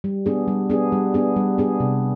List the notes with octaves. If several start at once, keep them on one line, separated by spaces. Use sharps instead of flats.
G3
B3 D4 G#4
G3
B3 D4 G#4
G3
B3 D4 G#4
G3
B3 D4 G#4
C3